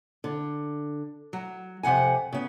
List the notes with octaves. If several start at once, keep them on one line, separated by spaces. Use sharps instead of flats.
D3
F#3
F2 C3 F#5 G#5
C#3 B3